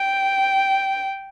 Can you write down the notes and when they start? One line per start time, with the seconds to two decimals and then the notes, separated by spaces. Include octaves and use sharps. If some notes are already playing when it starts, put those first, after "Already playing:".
Already playing: G5